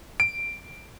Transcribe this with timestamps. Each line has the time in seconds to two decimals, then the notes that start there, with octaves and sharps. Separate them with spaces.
0.20 D7